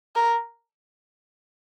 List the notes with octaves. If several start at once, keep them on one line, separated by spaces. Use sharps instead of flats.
A#4